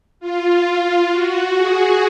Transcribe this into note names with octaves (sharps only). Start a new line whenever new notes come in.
F4
F4
F#4
G#4